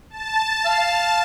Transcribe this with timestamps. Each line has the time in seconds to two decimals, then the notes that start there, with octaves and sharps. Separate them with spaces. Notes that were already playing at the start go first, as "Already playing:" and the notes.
0.10 A5
0.65 F5